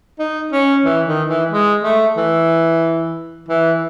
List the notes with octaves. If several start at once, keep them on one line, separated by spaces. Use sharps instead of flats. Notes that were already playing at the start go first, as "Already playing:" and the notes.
D#4
C#4
E3
D#3
E3
G#3
A3
E3
E3